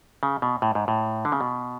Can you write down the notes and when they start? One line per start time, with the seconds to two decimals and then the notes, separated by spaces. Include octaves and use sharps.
0.23 C#3
0.42 B2
0.62 A2
0.75 G#2
0.88 A2
1.25 D3
1.32 C#3
1.41 B2